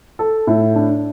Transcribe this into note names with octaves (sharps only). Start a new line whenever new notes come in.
A4
A2
D4